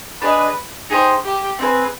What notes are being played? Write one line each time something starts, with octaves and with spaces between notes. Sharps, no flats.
D4 G#4 B4 C5 D#5
D#4 G4 G#4 C5
G4
C4 D#4 G#4 B4